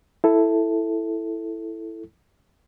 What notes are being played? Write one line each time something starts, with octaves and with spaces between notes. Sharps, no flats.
E4 A4